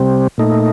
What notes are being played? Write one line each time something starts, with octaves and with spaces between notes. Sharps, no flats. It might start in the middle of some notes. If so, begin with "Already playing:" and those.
Already playing: C3 G3 C4
A#2 A3 D#4